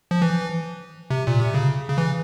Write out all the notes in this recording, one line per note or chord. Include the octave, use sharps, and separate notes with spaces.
F3
E3
C3
A#2
C3
C#3
C#3
E3